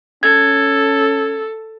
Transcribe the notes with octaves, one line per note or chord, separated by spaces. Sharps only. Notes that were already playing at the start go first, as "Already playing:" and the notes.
C#4 A4 G#6